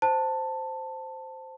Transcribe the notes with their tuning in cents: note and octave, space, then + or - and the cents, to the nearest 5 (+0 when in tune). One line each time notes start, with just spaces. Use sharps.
C5 -5 A5 +10